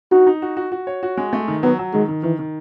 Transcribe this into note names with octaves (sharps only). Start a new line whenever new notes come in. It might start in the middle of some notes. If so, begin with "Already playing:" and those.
D#4 F#4
D#4
F#4
F#4
F#4
C#5
F#4
G#3
A3
D#3
F#3 B3
F#3
D#3 G#3
D#3
D#3 E3
D#3